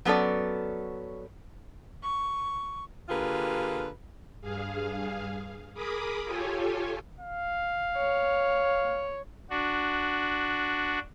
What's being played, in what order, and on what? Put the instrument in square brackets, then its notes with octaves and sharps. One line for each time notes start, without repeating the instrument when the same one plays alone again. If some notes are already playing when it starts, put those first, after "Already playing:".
[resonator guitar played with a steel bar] F#3 B3 C#4 A4 D5
[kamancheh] C#6
[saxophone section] D3 A#3 F4 G4 G#4 B4
[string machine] G2 G#4 F5
G#4 A#4 B5 D6 D#6
F4 G4 A4 C#5 G#5
[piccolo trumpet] F5
[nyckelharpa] C#5
[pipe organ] D4 F#4